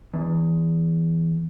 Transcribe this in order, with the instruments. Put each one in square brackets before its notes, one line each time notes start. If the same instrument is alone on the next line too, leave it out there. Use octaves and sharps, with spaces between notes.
[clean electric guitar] E2